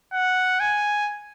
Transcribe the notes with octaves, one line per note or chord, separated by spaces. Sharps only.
F#5
G#5